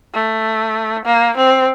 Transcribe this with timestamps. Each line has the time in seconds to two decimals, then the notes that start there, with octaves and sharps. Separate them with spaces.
0.14 A3
1.05 A#3
1.37 C4